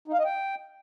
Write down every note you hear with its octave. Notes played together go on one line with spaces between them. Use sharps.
D#4
F5
D#5
G5